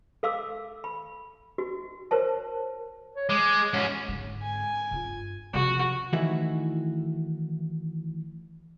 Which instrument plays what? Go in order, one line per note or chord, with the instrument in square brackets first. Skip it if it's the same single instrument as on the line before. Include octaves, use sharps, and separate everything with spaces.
[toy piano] A4 F5 D6 E6
B5
F#4
A#4 C5 C#5 A5
[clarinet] C#5
[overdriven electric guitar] G#3 [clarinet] D6
[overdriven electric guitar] G#2 C#4 [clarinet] C#5
[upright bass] G#2 D3
[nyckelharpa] G#5
[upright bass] G2 F4
[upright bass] C3 F3 [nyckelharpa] F#4
[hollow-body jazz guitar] D#3 E3 A3 E4 F#4 E5